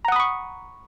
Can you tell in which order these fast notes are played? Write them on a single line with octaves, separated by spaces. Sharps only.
A#5 F#5 D#6 B5 C#6